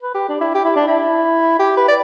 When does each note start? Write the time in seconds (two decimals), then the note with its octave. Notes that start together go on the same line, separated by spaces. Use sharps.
0.02 B4
0.14 G4
0.29 D4
0.41 E4
0.54 G4
0.65 E4
0.76 D4
0.87 E4
1.59 G4
1.77 B4
1.88 D5